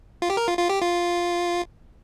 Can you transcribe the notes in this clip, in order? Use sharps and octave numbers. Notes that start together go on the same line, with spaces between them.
F4
G4
A#4
F4
F4
G4
F4